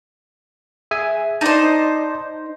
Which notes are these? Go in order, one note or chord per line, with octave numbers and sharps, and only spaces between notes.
G#4 E5 G#5
D#4 C5 D5 D#5 A5